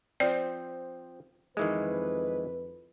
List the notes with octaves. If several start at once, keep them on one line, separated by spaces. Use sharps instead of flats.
F3 C4 D5
F2 D#3 E3 G#3 B4